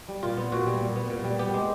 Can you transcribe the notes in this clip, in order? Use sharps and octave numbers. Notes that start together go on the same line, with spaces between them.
G3
A#2 F4
B3
A#2 F#4
G3
A#2
B3
A#2
G3
B3 G4
G#3